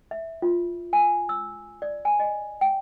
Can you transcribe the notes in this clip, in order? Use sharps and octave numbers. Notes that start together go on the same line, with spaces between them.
E5
F4
G#5
E6
D5
G#5
D#5
G5